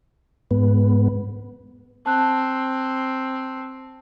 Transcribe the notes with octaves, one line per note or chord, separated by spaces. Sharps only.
G#2 B3
C4 A5 F#6